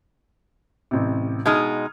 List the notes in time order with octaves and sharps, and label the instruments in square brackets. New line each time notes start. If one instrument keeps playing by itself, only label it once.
[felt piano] A1 C3
[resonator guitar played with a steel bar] B2 G#3 D#4 [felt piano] D#6 F6 G#6